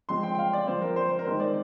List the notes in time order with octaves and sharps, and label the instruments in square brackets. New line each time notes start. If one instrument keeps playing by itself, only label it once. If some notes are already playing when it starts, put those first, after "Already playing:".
[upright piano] F3 G#3 C4 C6
G5
G5
F5
D5
F3 C4 C5
A#4
C5
C5
A#4
D#3 G#3 C4 C5
D5